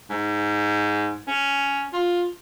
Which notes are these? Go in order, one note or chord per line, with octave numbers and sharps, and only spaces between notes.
G#2
C#4
F4